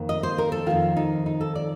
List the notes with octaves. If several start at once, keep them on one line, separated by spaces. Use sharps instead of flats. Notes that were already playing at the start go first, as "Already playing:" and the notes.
Already playing: F2 D#3 A#3
D#5
C5
A#4
A4
F2 C3 D#3 F4
D#4
D#4
A4
D5